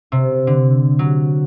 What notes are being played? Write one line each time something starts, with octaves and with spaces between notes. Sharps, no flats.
C3
D3
F#3